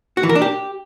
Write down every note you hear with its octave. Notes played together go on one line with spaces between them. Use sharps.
F#4
E3
A#4
D4
G4